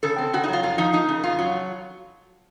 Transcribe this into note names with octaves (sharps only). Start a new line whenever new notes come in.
C#3 A4
C4
C#3 F#4
D#4
F#3 F4
F2 F4
F3 D#4
A#3 D#4
C#3
F2 F4
F#3